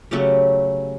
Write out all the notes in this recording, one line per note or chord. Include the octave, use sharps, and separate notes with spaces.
C#3 F#3 A3 C#4 G4